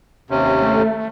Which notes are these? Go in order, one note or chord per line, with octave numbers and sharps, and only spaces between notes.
D#2 C3 C#4
A3